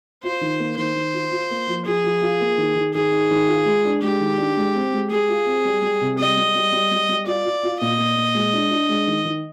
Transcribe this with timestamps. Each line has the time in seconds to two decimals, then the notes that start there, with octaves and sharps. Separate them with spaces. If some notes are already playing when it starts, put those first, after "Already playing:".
0.23 F4 C5
0.41 D#3
0.60 A#3
0.77 D#3 C5
0.95 D#3
1.13 F4
1.32 F4
1.51 A#3
1.67 F3
1.86 F3 G#4
2.04 F3
2.22 F4
2.41 A#3
2.58 D#3
2.76 D#3
2.94 D#3 G#4
3.12 D#4
3.31 D#3
3.48 F4
3.66 G#3
3.85 D4
4.02 G#3 G4
4.20 D#3
4.38 D4
4.57 G#3
4.75 C4
4.93 G#3
5.10 G#3 G#4
5.28 F4
5.46 C4
5.65 G3
5.82 G3
6.01 C3
6.18 G3 D#5
6.37 G3
6.55 G3
6.72 G3
6.91 G3
7.09 G3
7.26 F4 D5
7.45 F4
7.63 F4
7.81 A#2 D#5
7.98 A#2
8.16 A#2
8.35 G#3
8.53 D4
8.71 D4
8.89 G#3
9.07 D#3
9.25 D#3